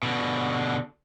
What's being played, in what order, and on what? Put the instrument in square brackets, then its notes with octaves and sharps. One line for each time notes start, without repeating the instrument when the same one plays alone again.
[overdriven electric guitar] B2 D3